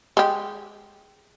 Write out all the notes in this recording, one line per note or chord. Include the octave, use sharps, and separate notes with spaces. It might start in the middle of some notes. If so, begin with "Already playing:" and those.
G#3 G4